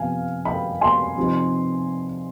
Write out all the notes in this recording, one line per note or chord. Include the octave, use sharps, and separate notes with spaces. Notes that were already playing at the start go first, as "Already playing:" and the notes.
Already playing: C3 F3 B3 F5 G#5
G5 B5
G#5 C6
C3 F3 C4 D#4